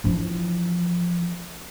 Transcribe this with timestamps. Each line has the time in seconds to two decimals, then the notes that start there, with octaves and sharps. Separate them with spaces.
0.04 E3 F3